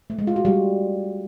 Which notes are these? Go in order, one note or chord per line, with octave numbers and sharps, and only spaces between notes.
A3
G#3
F4
F#4
G3